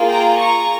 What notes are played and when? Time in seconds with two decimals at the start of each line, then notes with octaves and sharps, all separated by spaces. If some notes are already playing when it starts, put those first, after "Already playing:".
Already playing: A#3 F4 G#4
0.09 G5 A#5
0.39 A#5 C#6